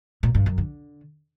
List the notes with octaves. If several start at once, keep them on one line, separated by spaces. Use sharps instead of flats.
A#2
G2
F#2
D3